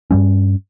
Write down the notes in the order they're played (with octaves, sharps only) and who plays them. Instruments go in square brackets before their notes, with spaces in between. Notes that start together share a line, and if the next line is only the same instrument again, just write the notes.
[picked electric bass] G2 G3 C#4